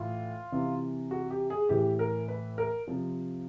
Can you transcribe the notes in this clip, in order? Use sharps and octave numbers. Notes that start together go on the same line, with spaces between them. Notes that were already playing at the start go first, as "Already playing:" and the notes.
Already playing: A2 E3 F4
C3 E3
F#4
G4
G#4
A2 E3 G4
A#4
B4
A#4
C3 F3